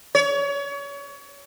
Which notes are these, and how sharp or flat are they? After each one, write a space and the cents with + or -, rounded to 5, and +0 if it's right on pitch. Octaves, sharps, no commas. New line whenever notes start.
C#5 +30